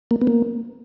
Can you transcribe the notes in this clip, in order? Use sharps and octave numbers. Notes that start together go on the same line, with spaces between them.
A#3
B3
A#3